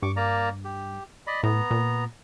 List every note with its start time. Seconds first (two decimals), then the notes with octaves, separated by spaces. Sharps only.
0.02 G2 C#6 D6
0.16 A#3 D5 A#5
0.65 G4
1.27 D5 D#5 B5
1.43 A2 B3 A#5
1.71 A#2